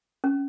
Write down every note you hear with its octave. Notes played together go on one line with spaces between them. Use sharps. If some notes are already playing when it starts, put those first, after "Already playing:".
C#4